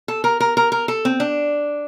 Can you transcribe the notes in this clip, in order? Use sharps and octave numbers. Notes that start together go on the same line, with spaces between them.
A4
A#4
A#4
A#4
A#4
A4
C4
D4